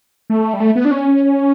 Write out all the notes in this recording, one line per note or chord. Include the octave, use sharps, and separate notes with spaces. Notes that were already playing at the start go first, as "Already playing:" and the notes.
A3
G3
A3
B3
D4
C#4